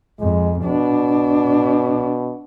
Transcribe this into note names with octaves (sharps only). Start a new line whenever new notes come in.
F2 G#3
B2 D4